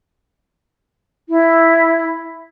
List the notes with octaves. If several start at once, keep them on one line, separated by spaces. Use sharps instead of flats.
E4